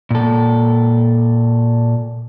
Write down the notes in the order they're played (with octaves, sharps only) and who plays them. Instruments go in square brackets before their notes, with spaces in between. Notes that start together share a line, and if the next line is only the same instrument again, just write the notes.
[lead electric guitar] A#2 A4